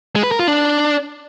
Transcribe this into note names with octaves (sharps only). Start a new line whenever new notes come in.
G#3
B4
A#4
F4
D4